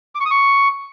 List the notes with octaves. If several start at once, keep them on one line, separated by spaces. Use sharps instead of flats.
D6
C#6
D#6
C#6